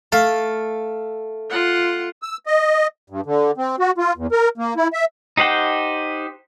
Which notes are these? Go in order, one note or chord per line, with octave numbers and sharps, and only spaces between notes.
A3 F5 A5
F4 F#5
E6
D#5
G2
D3
C4
F#4
F4
E2
A#4
A#3
E4
E5
D#4 G4 C5 F#5 G5